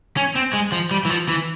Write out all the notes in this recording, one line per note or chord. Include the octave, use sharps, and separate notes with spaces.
C#4
C4
G#3
F3
G3
E3
F3
E3